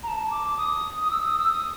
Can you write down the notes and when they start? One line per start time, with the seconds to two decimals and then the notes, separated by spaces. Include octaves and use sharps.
0.03 A#5
0.08 A5
0.31 D6
0.58 D#6
1.01 D#6
1.11 E6
1.25 D#6
1.39 E6
1.52 D#6